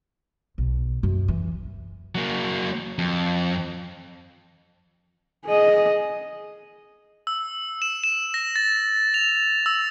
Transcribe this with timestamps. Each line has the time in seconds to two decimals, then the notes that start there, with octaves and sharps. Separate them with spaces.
0.58 B1
1.03 F#2
1.28 E3
2.15 F#3 A#3
2.98 F2
5.46 G#4 D#5
7.27 E6
7.82 E7
8.04 E7
8.34 A#6
8.56 A6
9.14 F7
9.66 E6